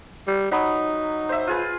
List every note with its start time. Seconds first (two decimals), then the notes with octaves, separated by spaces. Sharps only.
0.28 G3
0.52 F#3 D#4 B5 D#6
1.29 C5 E5
1.47 F4 G#4 B4